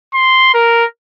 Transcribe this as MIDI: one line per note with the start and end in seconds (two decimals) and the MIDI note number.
0.14 0.53 84
0.54 0.85 70